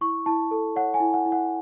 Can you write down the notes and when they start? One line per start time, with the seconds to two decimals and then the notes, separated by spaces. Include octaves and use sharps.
0.01 E4 C#6
0.26 E4 A5
0.51 A4
0.76 C#5 F#5
0.94 G#5
1.00 E4
1.14 F#5
1.26 E4
1.32 F#5